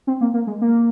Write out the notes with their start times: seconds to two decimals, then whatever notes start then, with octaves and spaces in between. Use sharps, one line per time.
0.07 C4
0.21 A#3
0.34 A#3
0.47 G#3
0.61 A#3